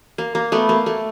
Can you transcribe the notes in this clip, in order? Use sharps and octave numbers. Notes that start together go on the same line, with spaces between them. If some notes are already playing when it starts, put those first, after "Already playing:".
A#3
A#3
A3 B3
A#3
A3